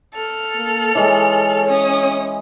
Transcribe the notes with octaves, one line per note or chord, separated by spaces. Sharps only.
A4 F6
A#3
E3 G#3 C#5
C#4 D#6